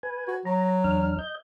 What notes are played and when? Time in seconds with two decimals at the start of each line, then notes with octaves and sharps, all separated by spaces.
0.03 B4 G#5
0.28 F#4
0.45 F#3 A#5
0.84 E2 D4 F6
1.19 D#5 G6